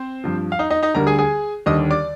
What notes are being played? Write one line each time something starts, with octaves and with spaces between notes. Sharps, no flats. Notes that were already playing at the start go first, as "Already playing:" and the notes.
Already playing: C4 C5
G2 F3
F5
D#4 D#5
D#4 D#5
D#4 D#5
D2 D3 G3 A#4 A#5
G#4 G#5
G#4 G#5
D#2 D3 G3 D#5 D#6
D5 D6